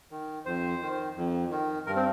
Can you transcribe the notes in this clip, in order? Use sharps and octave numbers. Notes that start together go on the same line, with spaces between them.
D#3
F2 C5
D#3
F2
D#3
G2 A#4
C4